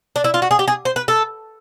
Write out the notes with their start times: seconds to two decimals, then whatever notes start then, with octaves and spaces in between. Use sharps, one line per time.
0.16 D4
0.24 E4
0.34 F4
0.42 F#4
0.51 G#4
0.59 G4
0.68 G#4
0.85 C5
0.96 B4
1.08 A4